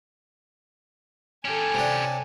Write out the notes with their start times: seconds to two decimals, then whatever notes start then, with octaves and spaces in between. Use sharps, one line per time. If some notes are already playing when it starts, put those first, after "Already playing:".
1.45 C#4 G4 A4 G#5
1.74 C3 D4